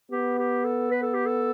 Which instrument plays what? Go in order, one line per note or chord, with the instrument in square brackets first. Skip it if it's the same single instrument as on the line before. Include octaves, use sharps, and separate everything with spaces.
[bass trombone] B3 [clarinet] G4
[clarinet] G4
A4
B4
A4
G4
A4